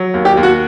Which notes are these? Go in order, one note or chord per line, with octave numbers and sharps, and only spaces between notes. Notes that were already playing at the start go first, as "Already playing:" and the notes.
Already playing: F#3
D#2
G4
D#2
F#4